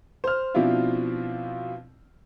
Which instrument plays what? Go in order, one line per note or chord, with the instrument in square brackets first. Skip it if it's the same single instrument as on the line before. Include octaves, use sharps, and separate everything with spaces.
[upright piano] C5 F6
B2 F3 C4 D4 E4 F4